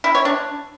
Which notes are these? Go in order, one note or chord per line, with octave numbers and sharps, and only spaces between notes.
E4
C#5
D4